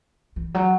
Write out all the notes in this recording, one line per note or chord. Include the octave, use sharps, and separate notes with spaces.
E3
F#3